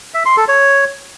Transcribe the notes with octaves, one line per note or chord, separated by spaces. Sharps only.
E5
C6
A4
C#5